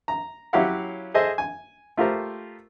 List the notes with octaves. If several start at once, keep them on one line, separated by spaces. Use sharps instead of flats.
A#5
F#3 C#4 E4 G4 F5 F#5
G#4 A4 C5 D#5 E5
G#5
A3 F4 G4 A#4 C5